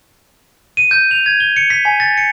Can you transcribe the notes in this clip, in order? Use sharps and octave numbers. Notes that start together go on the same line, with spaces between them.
D#7
G6
F7
G#6
G7
C#7
B6
G#5
A6
C#7